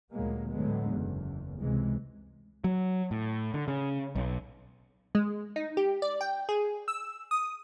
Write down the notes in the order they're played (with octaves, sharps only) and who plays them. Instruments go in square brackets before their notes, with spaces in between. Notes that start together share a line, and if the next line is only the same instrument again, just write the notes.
[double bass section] D2 A#2 F#3 G#3 A#3 B3
A2 D3 F#3 G#3 B3
F#1 E2
C#2 C3 E3 G#3
[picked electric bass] F#3
A2
D3
C#3
B1
[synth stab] G#3
D#4
G4
D5
G5
G#4
E6
D#6